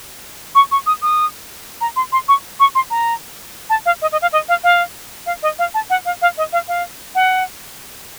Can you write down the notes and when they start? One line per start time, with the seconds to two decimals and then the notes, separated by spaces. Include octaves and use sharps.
0.55 C#6
0.71 C#6
0.86 D#6
1.02 D#6
1.81 A#5
1.96 C6
2.12 C6
2.28 C#6
2.60 C#6
2.75 C6
2.90 A#5
3.70 A5
3.86 F5
4.02 D#5
4.12 D#5
4.22 F5
4.33 D#5
4.49 F5
4.64 F5
5.26 F5
5.43 D#5
5.59 F5
5.74 A5
5.90 F#5
6.05 F5
6.22 F5
6.37 D#5
6.53 F5
6.68 F5
7.15 F#5